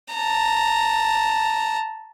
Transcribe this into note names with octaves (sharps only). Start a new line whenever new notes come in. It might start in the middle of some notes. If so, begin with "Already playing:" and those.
A5 A#5